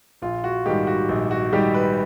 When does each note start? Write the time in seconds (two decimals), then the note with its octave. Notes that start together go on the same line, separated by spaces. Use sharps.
0.22 A#1 F4
0.44 F#4
0.66 G#2 D#3 G3 G4
0.87 F#4
1.09 A#1
1.31 F#4
1.53 G#2 D#3 G3 G4
1.74 B4